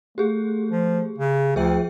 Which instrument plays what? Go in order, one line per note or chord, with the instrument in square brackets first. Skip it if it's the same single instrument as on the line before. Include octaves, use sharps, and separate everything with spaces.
[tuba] A3 [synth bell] G4 G#4
[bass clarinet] F3
C#3
[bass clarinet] D2 [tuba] F3 [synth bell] G#4 E5 G5